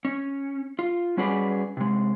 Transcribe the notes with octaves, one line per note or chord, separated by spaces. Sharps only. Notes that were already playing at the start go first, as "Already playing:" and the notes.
C#4
F4
G3 C#4 F#4 G#4 B4 D5
C3 G#3